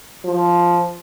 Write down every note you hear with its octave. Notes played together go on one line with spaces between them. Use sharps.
F3